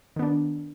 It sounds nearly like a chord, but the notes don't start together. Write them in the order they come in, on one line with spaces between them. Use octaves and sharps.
D#3 B3 D4